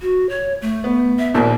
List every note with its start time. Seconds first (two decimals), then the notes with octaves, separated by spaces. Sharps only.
0.01 F#4
0.29 C#5
0.62 A3
0.84 B3
1.19 E5
1.34 A#1 D#2 A#2 A#4